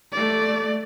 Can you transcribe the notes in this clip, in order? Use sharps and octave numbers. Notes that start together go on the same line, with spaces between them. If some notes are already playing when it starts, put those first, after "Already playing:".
A3 D5